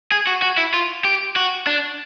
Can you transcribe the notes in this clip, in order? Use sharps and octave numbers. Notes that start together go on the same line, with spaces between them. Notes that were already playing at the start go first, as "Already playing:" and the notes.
G#4
F#4
F#4
E4
F4
G4
F#4
D4